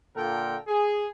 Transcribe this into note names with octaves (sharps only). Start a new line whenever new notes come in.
A#2 D3 F4 A4 A#4 G5
G#4